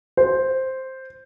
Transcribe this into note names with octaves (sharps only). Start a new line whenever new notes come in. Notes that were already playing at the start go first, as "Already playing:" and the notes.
C5